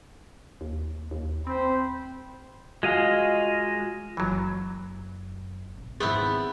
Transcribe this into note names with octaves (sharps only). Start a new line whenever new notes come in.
D#2
D#2
C4 C5 G5 B5
G#3 F4 F#4 D#5 F5 G#5
F#1 F#2 E3 F#3
A1 C3
G#1 D#2 B3 C4 E4 G#4